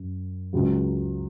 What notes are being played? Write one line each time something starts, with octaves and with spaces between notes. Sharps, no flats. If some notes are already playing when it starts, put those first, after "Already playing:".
Already playing: F#2
C#2 C#3 F#3